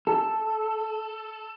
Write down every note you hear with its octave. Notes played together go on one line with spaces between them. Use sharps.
A4